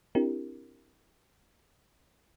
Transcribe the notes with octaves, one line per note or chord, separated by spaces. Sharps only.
C4 D4 E4 G4 A#4